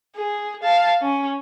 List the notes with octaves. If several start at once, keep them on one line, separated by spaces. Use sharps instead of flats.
G#4
F5 A5
C#4